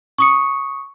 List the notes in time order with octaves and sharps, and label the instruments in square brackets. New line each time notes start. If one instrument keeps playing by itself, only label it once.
[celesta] C#6 D#6 C#7